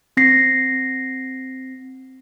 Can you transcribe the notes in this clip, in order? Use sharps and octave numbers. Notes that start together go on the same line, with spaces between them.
C4 A#6 C7